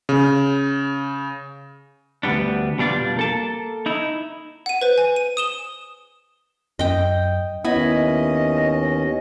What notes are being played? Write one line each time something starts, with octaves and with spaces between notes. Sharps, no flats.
C#3
D2 G#2 G3 B3 D4
F2 B2 G3 D4 F4 D5
A#3 A4 A5
D#4 E4
F#5 D#7
B4 C5
G#5
D#7
D#6 E7 G7
F#2 D#5 G5
D#2 B3 C#4 E4 D#5 G#5